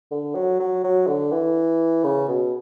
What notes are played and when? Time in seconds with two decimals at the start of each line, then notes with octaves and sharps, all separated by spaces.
0.11 D3
0.35 F#3
0.60 F#3
0.84 F#3
1.07 D3
1.32 E3
2.04 C#3
2.28 B2